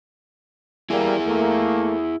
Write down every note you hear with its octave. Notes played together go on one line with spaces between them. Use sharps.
G3 A#3 E4 G#4
A3 A#3